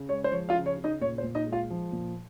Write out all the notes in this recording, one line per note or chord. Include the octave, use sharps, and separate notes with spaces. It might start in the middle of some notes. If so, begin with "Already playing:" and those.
Already playing: C#3
G#3 C#5
C5
F3 C#5
F4 F5
C#3
C#5
C#3
D#4 D#5
A#2 C#5
C5
A#2
D#4 D#5
G#3
F4 F5
F3
A#2